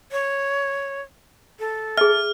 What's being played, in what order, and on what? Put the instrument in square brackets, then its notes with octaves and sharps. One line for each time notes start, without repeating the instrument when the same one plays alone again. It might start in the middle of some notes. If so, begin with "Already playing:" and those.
[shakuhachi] C#5
A4
[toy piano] G#4 E5 [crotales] F6